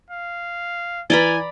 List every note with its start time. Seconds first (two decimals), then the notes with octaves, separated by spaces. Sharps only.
0.11 F5
1.10 E3 B4 D5 G#5 A#5 B5 A6 G7